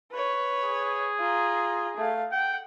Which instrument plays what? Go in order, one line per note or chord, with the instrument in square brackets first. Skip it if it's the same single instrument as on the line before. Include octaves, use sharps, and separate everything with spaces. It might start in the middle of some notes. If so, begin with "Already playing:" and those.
[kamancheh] B4 C#5
[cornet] G#4
[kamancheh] F4 A#5
A3 F5
[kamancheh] F#5 [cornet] G5